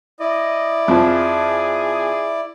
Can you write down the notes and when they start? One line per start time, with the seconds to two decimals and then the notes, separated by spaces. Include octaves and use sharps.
0.20 E4 D5 D#5
0.88 F2 F3 G#4